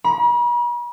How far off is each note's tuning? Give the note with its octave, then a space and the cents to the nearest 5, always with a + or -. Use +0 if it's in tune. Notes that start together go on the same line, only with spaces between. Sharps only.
B5 -45